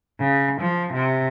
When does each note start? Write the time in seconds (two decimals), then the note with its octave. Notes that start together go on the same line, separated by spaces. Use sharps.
0.20 C#3
0.61 F3
0.92 C3